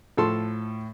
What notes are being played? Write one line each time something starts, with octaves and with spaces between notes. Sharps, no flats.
A2 F3 A4 C6